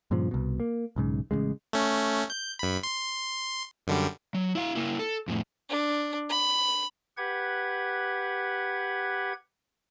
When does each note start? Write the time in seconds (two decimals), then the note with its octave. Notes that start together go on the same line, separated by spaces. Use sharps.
0.11 G2 A#2 C#3 F3
0.31 C2 B2
0.60 A#3
0.96 B1 G#2 C#3
1.31 A1 A#2 C#3 G#3
1.73 A3 C#4
2.30 G6
2.59 F#2 B5
2.83 C6
3.87 F#2 D3 G3
4.34 F#3
4.55 E4 F5
4.75 A#3 E4
4.99 A4
5.28 F2 A2
5.69 D4
6.29 B5
7.17 G4 B4 F#5 G#6